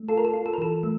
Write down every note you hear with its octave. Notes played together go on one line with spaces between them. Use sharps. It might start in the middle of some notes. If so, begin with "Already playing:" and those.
Already playing: A3
F4 A4
A#4
A4
F4
A4
A#4
E3 A4
A3